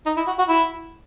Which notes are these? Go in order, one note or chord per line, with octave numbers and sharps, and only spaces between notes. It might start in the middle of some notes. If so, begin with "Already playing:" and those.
D#4
E4
F#4
F#4
E4